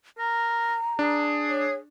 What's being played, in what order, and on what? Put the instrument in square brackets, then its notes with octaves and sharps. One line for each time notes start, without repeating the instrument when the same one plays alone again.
[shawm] A#4 [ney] A#5
[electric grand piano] D4 [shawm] G#4
[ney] C#5